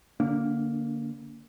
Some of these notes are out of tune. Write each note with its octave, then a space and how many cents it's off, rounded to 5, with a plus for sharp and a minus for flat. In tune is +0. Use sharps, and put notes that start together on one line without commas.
D3 +0 A#3 +0 D4 -45